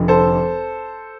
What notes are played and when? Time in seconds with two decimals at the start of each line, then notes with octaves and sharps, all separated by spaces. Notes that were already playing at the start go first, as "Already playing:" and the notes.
Already playing: F1 F2 D3 F3
0.08 A4 C5